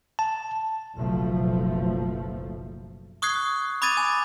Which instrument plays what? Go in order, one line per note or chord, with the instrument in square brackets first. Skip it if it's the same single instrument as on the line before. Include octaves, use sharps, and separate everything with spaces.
[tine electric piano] A5
[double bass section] F#1 B1 B2 F3 A3
[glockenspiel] C#6 D#6 F#6 G#6 C7
B5 D6 D#6 G#6 A6 D#7
G#5